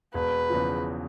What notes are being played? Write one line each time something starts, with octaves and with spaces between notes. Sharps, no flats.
E1 B4
E2 C#3 F3